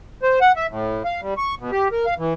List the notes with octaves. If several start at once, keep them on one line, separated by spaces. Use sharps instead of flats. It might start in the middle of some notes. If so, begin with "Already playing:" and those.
C5
F#5
E5
A2
F5
G3
C#6
B2
G4
A#4
F5
E3